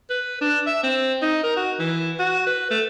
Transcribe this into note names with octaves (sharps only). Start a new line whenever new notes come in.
B4
D4
E5
C4
D#4
A#4
F#4
E3
F#4
B4
A3